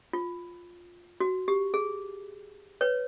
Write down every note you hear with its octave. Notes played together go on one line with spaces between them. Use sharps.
F4
F#4
G4
G#4
B4 C#5